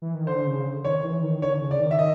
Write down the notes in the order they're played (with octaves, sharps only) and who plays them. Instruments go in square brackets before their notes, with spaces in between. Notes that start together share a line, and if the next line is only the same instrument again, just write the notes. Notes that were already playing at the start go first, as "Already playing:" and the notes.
[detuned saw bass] E3
D#3
[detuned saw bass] D3 [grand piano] C5
[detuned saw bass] C#3
[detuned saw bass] D#3 [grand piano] C#5
[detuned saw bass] E3
D#3
[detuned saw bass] D3 [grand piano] C#5
[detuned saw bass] C#3
[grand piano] D5
[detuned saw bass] D#3
[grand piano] E5
D#5